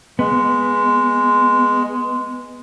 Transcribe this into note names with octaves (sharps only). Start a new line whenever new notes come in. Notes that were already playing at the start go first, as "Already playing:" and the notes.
G#3 B3